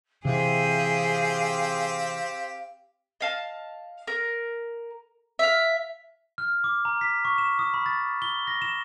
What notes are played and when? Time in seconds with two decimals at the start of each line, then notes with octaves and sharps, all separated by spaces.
0.25 C3 E3 C4 G4 G#4 F5
3.21 D#5 F5 A5
4.07 A#4
5.39 E5 F5
6.38 F6
6.64 D6
6.85 A#5
7.01 B6
7.25 C#6
7.38 E7
7.59 D#6
7.74 B5
7.86 A6
8.22 G7
8.47 A#6
8.62 E7